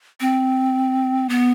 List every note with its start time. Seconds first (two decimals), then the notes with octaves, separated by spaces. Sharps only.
0.20 C4
1.29 B3